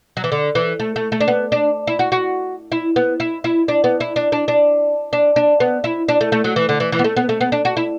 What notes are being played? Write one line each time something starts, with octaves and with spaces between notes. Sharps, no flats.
F#3
E3
D3
E3
A3
A3
A3
D4
B3
D4
E4
F#4
F#4
E4
B3
E4
E4
D4
B3
E4
D4
D4
D4
D4
D4
B3
E4
D4
A3
A3
F#3
E3
D3
E3
E3
B3
A3
B3
A3
B3
D4
F#4
E4